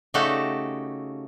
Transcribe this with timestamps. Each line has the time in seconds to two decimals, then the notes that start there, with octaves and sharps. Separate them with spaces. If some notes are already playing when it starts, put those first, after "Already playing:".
0.14 C#3 A3 D#4 F#4 G4 A4